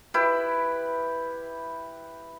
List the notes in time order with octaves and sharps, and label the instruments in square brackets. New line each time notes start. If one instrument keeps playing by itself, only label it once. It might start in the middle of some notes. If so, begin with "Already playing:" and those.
[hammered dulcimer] E4 G4 B4